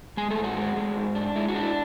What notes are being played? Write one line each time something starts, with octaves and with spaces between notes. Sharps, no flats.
G#3 G#4 G#5
A3 A4
G#2
F#4
G#3
G#3
G#2
D4
G#3 E4
F#4
D4
E4